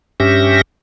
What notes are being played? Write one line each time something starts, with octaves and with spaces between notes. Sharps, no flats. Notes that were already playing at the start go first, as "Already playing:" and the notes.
G2 C#4 G4 E5 A#6